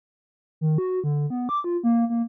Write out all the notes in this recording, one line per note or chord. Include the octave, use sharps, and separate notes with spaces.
D#3
F#4
D3
B3
D6
F4
A#3
A#3